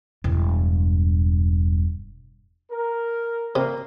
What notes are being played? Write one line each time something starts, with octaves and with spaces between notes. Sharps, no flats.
E1 G2
A#4
C3 A#3